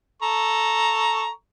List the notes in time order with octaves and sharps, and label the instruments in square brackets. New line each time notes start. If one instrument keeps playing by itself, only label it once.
[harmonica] A4 A#5 C#6